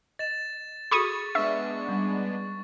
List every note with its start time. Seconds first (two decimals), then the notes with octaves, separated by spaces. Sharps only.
0.19 D#5 A6 E7
0.91 F#4 G#4 A4 B5 C#6 D#6 G#6
1.35 G#3 B3 D4 E5 C#6
1.87 G3 C#4